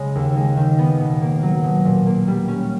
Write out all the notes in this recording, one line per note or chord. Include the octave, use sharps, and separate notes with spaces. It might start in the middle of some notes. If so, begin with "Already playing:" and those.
Already playing: C#3 G#3
D#2
G#3
D#3
B3
B2
A#3
F#3
B2
A#2
A#3
G3
C#4